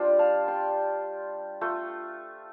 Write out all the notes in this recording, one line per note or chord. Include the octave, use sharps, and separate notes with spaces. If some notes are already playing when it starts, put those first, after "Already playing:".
Already playing: G3 D4 F4 G4 C5
F5 A5
G5 C6
A3 F4